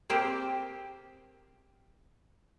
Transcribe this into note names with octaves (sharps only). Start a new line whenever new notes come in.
A#3 C4 G4 G#4 C5